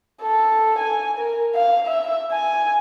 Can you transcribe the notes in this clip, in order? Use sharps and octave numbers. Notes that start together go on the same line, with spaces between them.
A4
G#5
A#4
F5
E5
G#5